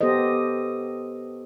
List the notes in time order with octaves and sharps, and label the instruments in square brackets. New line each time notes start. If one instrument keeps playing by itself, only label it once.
[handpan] B3 G4 A4 C5 D#5